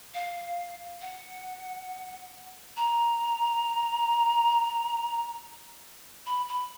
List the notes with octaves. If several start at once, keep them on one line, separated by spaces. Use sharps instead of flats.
F5
F#5
A#5
B5
B5